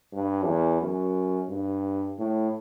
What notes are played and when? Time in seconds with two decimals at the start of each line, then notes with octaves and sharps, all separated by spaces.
0.13 G2
0.46 E2
0.81 F#2
1.49 G2
2.18 A2